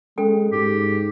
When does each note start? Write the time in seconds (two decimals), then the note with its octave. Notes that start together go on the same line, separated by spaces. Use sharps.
0.18 G#3 C#4 A4 G5
0.52 G#2 G4